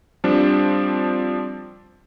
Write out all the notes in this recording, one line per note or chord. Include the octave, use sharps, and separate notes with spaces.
F3 G3 C4 D4